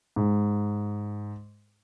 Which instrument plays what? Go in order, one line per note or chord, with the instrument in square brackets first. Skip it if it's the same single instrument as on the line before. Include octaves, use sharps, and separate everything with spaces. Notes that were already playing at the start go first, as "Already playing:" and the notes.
[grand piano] G#2